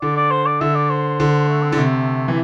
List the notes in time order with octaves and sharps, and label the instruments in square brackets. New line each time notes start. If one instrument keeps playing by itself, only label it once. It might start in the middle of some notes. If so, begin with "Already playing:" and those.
[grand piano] D3 [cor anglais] D5
[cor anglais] D5
C5
D5
[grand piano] D3 [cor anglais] E5
[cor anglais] D5
C5
[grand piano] D3
[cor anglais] A3
C4
[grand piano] D3
[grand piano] C3 [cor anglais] A3
[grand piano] E3